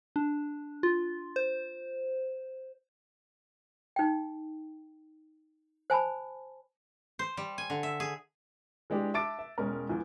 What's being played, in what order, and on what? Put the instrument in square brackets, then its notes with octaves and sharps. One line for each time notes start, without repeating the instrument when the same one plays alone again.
[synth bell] D4
F4
C5
[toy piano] D#4 G5
C5 G#5 A5 B5
[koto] C5
G3
G#5
D3
E5
G#4
[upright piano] E3 G#3 D4 G4
E5 A5 D6 A6 D7
E5
E1 G#3 C#4 A#4
E2 E3 F3